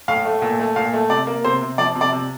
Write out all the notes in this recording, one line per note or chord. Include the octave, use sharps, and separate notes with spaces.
A2 F5
A3
A#2
A3
A#2 F5
A3
C3 D5
A#3
C3 C5
C3
F3 D5
C3
D5
C3